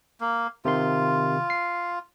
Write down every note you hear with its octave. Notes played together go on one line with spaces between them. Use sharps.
A#3
C3 D#3 F4 C6
C7